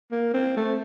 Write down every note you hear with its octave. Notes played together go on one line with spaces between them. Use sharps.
A#3
C4
A3